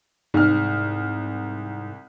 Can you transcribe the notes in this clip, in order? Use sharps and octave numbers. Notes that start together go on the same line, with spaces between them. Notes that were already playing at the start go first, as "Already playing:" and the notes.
C2 G#2 F6